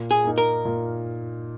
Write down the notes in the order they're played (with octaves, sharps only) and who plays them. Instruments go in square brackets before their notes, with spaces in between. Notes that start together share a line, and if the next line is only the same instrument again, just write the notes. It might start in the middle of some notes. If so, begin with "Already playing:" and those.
Already playing: [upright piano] A#2
[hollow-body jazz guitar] G#4
[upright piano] A#3 D#4
[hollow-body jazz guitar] A#4
[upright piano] A#2